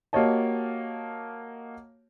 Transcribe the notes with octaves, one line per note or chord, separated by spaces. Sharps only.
A#3 F#4 G4 C#5 D#5 A5